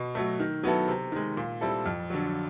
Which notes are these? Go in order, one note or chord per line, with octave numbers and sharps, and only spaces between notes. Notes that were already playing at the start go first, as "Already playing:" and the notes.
Already playing: B2
F#3 A3
D#3
F#3 B3 E4 A4
C3
D#3 G#3
A#2
G3 C4 E4 A4
F2
D3 F#3